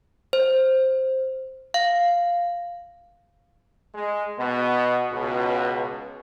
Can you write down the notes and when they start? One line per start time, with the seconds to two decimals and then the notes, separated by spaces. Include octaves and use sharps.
0.33 C5
1.74 F5
3.94 G#3
4.38 B2 B3
5.12 C#2 B2